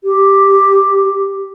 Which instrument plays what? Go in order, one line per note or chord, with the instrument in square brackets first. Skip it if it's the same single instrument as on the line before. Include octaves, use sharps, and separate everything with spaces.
[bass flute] G4